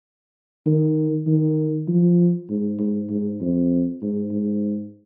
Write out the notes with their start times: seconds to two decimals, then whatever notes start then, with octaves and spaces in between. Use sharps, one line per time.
0.66 D#3
1.27 D#3
1.88 F3
2.49 G#2
2.79 G#2
3.10 G#2
3.41 F2
4.02 G#2
4.32 G#2